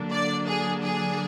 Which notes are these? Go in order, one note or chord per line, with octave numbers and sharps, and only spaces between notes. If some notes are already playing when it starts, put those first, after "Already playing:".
Already playing: D3 F#3 A#3 D4
D5
G#4
G#4